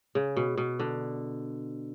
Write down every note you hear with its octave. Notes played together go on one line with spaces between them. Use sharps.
C#3
B2
B2
D3